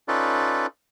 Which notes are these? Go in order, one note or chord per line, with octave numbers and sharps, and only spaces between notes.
C#4 D#4 F4 A4 B4 D5